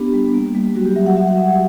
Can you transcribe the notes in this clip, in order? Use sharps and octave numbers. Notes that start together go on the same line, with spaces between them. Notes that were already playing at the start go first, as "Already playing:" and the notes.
Already playing: B3 D4 G4
G3
A#3
G3
F#3 F#4
G4
F#3 E5
F#5
F#4 E5
F#5
G3 E5